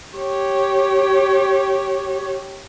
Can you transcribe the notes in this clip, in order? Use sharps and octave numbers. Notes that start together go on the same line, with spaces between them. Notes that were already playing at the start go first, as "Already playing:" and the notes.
G4 C#5